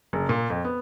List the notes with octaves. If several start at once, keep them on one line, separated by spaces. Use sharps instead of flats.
F#1
A#2
F2
B3